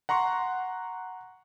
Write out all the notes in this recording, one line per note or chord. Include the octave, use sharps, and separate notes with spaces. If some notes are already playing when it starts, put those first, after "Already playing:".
F#5 A#5 C6 C#6